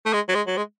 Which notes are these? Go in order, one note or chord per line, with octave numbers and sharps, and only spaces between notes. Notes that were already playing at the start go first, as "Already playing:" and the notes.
A3
G#3
F#3
G#3
F#3
G#3